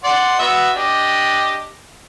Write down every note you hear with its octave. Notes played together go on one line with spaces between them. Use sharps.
D5 F#5 C6
B3 F#4 E5
D4 G4 D#5